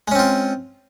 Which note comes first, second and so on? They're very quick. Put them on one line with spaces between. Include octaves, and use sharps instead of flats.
G#3 C#4 C4 F4